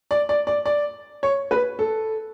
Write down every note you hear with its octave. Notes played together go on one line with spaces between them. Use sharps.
D5
D5
D5
D5
C#5
B4
A4